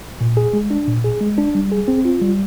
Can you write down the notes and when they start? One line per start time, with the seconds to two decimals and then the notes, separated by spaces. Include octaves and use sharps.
0.21 A#2
0.37 G#4
0.53 G#3
0.70 D4
0.87 A#2
1.04 G#4
1.21 G#3
1.38 D4
1.55 G3
1.72 G#4
1.88 C4
2.05 F4
2.22 G3